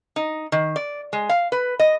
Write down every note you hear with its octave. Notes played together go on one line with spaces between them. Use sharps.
D#4
D#3
D5
G#3
F5
B4
D#5